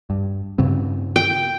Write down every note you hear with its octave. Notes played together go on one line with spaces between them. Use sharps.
G2
G2 C#3 C4
G5